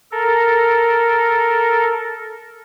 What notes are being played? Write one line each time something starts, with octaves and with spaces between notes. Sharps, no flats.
A4 A#4